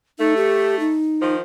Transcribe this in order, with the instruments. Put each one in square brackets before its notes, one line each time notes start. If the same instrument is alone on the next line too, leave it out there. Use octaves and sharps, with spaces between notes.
[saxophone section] A3 [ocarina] D#4
[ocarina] G4
D#4
[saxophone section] D#3 F3